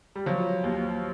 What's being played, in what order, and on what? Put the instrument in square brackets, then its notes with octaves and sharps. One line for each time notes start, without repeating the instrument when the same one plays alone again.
[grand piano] G3
[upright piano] F3 [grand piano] F#3
[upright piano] D#2